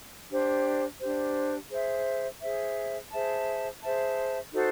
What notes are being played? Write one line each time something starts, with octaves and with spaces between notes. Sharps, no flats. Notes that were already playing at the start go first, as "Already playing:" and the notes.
D4 G4 C5
D4 G4 C5
G#4 C5 E5
G#4 C5 E5
G#4 C5 E5 A5
G#4 C5 E5 A5
D#4 F#4 A4 C5